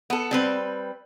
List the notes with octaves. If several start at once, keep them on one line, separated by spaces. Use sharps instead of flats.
B3 A4
G3 C4 B4